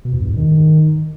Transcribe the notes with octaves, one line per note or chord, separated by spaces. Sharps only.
B2
E2
G2
G#2
D#3